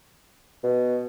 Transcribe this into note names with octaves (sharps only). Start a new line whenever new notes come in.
B2